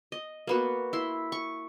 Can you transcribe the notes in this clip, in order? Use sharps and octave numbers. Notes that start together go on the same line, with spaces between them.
D#5
A#3 B3 F#4
E4 C6
C#6